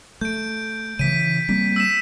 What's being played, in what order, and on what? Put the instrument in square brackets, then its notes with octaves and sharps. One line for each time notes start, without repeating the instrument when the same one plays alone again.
[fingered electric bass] A3 [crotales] G6 D7
[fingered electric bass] C#3 E3 [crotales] B6 D#7
[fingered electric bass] G3 A#3 C4 [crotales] B6
[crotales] E6 B6 E7